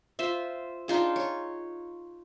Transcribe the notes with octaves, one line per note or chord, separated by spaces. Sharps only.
F4 C5 E5
D4 D#4 F4 G#4
C#5